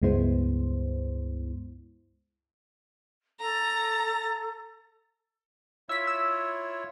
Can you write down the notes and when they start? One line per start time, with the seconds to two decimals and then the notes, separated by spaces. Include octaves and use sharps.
0.02 C#2 G2 G#3 B3 E4 C5
3.40 A4 A#5
5.89 E4 F4 C#5 E5 B6
6.07 E6